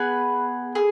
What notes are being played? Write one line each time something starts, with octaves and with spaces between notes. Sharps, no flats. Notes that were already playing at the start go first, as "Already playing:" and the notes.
Already playing: B3 G#4 B4
G#4